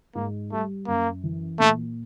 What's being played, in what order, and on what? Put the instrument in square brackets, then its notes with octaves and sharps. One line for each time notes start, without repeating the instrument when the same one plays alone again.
[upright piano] G#2 [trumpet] A#3
[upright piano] G3 [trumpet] A3
[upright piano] F#2 [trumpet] A#3
[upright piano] E3
[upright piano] A#2 [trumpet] A3